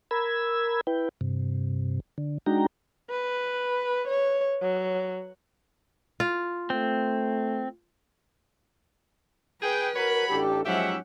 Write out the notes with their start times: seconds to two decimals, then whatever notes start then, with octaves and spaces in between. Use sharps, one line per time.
0.11 A#4 B5 E6 G#6
0.87 E4 B4 G5
1.21 G2 C3
2.18 D3
2.46 G#3 D4 D#4 F#4 G5 A#5
3.10 B4
4.08 C#5
4.62 F#3
6.20 F4
6.70 A3 C4
9.62 G#4 B4 G5
9.95 F#4 A#4 C#5 B5
10.29 A1 D4 G4 A4
10.65 G#2 F3 F#3 C#4 G4 E5 F#5